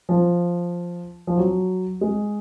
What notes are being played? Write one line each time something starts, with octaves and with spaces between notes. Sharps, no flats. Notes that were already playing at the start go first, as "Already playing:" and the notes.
F3
F3
F#3
G#3